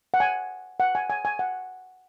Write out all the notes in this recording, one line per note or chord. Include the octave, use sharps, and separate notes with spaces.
F#5
G#5
F#5
G#5
G#5
G#5
F#5